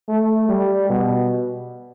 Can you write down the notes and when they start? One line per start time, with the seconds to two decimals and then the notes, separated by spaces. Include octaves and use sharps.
0.08 A3
0.49 G3
0.90 B2